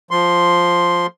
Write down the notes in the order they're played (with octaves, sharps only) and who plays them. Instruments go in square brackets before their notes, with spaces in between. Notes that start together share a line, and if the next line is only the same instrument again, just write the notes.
[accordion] F3 C6